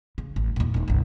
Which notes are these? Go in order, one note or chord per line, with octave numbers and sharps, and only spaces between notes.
C#3
A1
D#2 A#2
D#1 D#4
G1 C2